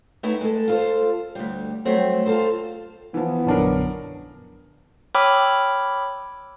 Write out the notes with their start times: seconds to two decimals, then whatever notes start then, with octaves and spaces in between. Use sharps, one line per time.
0.23 A3 B3 D#4 E4 E5
0.41 G#3 A4
0.68 F4 A4 C5
1.35 D2 G3
1.85 F#3 G3 A3 C4
2.26 F4 A4 C5
3.14 E3 F3 B3
3.47 A#1 F#2 D3 C#4 D4 A#4
5.15 C#5 G5 B5 D6 E6 F6